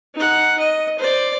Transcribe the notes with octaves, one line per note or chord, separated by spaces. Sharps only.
D#4 F#5
D#5
C5 D5